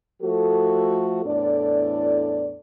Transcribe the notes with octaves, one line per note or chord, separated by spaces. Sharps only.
F3 A3 F#4 A4
E2 A2 D4 A4 D5